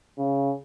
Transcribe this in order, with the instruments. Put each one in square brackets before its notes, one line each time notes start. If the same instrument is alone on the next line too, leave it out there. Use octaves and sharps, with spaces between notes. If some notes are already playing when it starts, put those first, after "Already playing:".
[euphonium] C#3